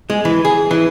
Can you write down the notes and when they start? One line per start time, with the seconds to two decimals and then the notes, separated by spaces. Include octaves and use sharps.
0.10 G#3
0.25 E3
0.45 G#4
0.71 E3